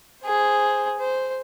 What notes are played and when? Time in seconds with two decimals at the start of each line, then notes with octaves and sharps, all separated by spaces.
0.24 G#4 C5
0.99 C5